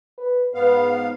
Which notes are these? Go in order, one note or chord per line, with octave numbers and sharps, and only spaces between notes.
B4
G#2 B3 B4 F5